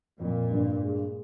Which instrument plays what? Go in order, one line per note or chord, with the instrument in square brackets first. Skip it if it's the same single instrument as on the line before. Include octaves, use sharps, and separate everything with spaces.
[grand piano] F2 [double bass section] A#2
[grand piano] G2
G#3